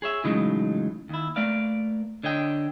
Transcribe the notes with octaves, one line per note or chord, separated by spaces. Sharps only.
G#4 C#5 E5
A2 C#3 E3 F#3 G#3 D#4
D#2 E4
A3 A#3 B4 D5 F5
D3 C#5 D#5 G5